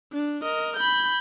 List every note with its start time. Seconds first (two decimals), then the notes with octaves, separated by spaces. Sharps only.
0.13 D4
0.42 A#4 D#5
0.77 B5 G6